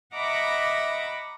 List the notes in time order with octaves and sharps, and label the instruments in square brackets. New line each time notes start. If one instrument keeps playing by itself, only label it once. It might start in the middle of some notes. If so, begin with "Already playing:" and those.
[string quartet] D#5 E5 F#5 A#5 B5 D6